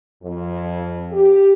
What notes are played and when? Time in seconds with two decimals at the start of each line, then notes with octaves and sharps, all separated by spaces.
0.23 F2
1.12 G4